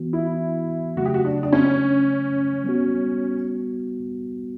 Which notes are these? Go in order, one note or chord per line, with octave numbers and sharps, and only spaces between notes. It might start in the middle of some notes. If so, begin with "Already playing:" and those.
Already playing: E3 B3 F#4
E4
C#3 F#3 A3 F#4
G4
F#4
D4
D4
C#4
G3 B3 F#4